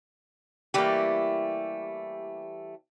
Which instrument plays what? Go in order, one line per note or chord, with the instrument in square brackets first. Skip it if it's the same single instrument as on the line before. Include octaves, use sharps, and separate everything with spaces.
[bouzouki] E3 G3 A3 [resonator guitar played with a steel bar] A#3 G4